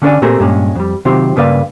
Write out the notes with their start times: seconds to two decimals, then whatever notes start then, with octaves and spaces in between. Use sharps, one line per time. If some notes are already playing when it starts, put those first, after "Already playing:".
0.02 D3 C#4 D4 B4 D5 G#5
0.22 A#2 A3 C4 G4 G#4 A#4
0.40 G2 A#2 G#3 C#4
0.75 F2 G3
1.05 C3 D#3 F#3 C4 F4 G4
1.36 G2 C#3 A#3 B4 D5 F5